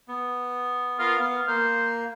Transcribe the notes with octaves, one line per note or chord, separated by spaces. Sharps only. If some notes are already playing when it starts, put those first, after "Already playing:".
B3
B3 F4 A#4 F5
B3 F5
A#3 C5